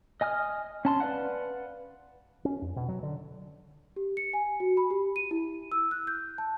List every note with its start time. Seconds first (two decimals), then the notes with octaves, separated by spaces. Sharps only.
0.21 D#5 G#5 D#6 F6
0.85 C#4 A5 C6
1.00 B4 D5 F5 F#5
2.45 C#4
2.62 F2
2.76 B2
2.88 F#3
3.03 D3
3.96 G4
4.17 C#7
4.33 G#5
4.60 F#4
4.77 B5
4.91 G4
5.16 D#7
5.31 E4
5.72 E6
5.91 F#6
6.07 G6
6.38 A5